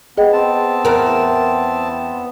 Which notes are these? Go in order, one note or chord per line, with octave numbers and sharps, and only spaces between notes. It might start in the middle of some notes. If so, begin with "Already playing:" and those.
B3 G#4 D#5 G5
C4 A5
E2 A#4